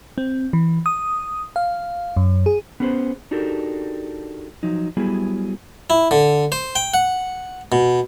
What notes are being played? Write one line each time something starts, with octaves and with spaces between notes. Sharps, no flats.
C4
E3
D#6
F5
F#2
G#4
B3 C#4 G#4 B4 C5
D4 D#4 F#4 G4 A4 A#4
F3 F#3 D#4
F#3 G3 B3 E4 G#4
E4
D3
C5
G5
F#5
B2